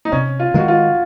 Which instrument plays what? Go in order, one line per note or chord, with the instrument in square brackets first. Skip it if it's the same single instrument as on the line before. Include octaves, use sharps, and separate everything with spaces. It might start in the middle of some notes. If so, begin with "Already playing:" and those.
[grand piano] D#4
[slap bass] C3 [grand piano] C#4
[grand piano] F4
[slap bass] D#3 G#3 [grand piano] F#4
[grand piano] F4